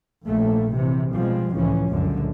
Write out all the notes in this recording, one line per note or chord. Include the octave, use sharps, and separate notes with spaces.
A#1 A3 A#3
C3 E3
B2 F3 G3 G#3 C4
C#2 A2 E3 F3 C#4
C#2 F#2 A#2 D3